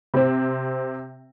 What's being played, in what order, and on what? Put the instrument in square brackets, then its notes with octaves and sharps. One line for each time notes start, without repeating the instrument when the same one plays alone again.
[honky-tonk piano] C3 C4